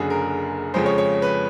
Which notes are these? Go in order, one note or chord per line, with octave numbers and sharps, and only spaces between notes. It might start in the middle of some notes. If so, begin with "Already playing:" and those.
Already playing: F#1 F#2 D3 G#4
A#4
F2 C#3 F3 G#3 C5
C#5
C#5
B4